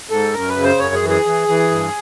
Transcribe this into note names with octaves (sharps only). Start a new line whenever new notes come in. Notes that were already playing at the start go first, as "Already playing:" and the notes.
G#2 A4
F#2 A#4
B4
C#3
C5
F#2 C#5
G#4
E3
G#4
E3
E3
G2